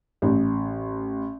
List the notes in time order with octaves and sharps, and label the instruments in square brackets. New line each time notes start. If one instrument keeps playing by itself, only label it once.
[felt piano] A1